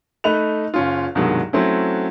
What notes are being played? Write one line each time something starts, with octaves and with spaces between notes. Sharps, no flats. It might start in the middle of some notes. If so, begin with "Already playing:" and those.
A3 D#4 D#5 B5 F#6 F7
F#1 C#4 F4
C2 G2 B2 D#3 F#3 G#3
F#3 A3 C4 C#4 E4